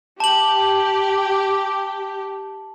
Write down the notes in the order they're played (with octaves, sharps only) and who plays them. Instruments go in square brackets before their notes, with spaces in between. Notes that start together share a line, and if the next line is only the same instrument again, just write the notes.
[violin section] G4 [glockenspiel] A5 F#7